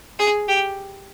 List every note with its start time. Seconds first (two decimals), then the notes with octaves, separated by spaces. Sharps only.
0.19 G#4
0.49 G4